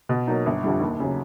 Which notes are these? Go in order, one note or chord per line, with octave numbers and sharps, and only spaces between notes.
B2
F#3 A#3 D#4
G1
F2 D3 G3
D#2
C#3 F#3